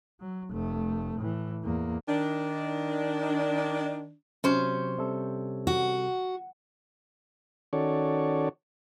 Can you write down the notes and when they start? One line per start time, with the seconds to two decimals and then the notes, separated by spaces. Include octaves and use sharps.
0.21 F#3
0.51 F1 A3
1.19 A2 E3
1.63 E2 A#3
2.08 D#3 D4
4.44 C3 F#3 C#4 C5
4.98 C3 G3 A4
5.67 F#4
7.73 D#3 C#4 F#4 A4 C#5 D5